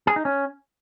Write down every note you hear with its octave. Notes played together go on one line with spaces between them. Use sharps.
G#4
D#4
C#4